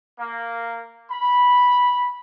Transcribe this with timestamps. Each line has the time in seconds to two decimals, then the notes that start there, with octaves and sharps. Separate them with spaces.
0.19 A#3
1.12 B5